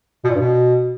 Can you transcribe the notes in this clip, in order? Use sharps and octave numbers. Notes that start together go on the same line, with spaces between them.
B2
A#2
G2
B2